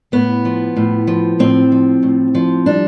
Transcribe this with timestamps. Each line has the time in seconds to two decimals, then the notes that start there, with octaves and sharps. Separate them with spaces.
0.12 A2 B3
0.45 F3
0.77 A2
1.07 F3
1.39 A2 C4
1.72 F3
2.03 A2
2.35 F3
2.66 G3 D4